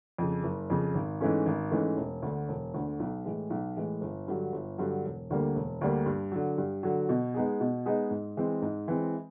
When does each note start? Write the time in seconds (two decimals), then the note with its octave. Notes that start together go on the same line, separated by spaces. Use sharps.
0.18 F2 C#3
0.43 F#1
0.70 F2 C#3
0.95 G#1
1.21 G#2 E3 A3 C#4
1.46 G#1
1.71 G#2 E3 A3 C#4
1.97 E1
2.22 D2 D3
2.49 E1
2.74 D2 D3
3.00 B1
3.25 A2 E3 G#3
3.50 B1
3.77 A2 E3 G#3
4.01 G1
4.28 G2 D3 F#3
4.52 G1
4.78 G2 D3 F#3
5.04 E1
5.30 D2 D3 G3 A#3
5.56 E1
5.81 D2 D3 G3 A#3
6.06 G2
6.32 D3 F#3
6.58 G2
6.83 D3 F#3
7.09 B2
7.34 G#3 B3 D#4 G#4
7.61 B2
7.86 G#3 B3 D#4 G#4
8.10 G#2
8.37 E3 G#3 C4
8.62 G#2
8.88 E3 G#3 C4